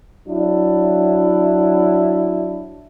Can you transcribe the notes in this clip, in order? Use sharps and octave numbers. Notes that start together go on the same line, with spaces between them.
F#3 D4 E4